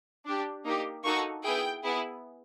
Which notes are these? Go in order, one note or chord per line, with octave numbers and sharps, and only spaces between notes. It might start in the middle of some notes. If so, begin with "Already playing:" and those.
D4 G4
A#3 D#4 G4
A#3 D#4 F#4 A4 C#6
B3 E4 G#4 G5
B3 E4 G#4